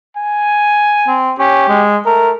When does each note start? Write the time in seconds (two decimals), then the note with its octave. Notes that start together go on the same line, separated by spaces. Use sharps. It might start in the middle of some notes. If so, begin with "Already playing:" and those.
0.17 G#5
1.07 C4
1.39 C#4 G4
1.69 G#3
2.06 A3 A#4